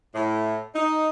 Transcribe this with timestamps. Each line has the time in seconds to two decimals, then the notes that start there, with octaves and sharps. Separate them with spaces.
0.14 A2
0.75 D#4